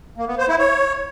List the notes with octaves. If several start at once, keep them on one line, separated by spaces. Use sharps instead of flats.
A#3
B3
C5
E4
C#5